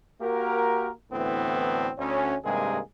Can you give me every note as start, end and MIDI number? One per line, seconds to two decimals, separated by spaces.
0.21 0.90 58
0.21 0.90 66
0.21 0.90 67
0.21 0.90 70
1.11 1.89 38
1.11 1.89 45
1.11 1.89 50
1.11 1.89 52
1.11 1.89 59
1.11 1.89 60
1.97 2.35 38
1.97 2.35 61
2.44 2.79 43
2.44 2.79 48
2.44 2.79 51
2.44 2.79 56
2.44 2.79 58
2.44 2.79 68